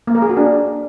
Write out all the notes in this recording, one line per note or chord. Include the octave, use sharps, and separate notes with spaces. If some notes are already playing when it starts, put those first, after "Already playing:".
A#3
A#4
G#4
F#4
D4